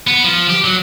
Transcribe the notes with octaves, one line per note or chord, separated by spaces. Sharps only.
B3
F3
G4
F#3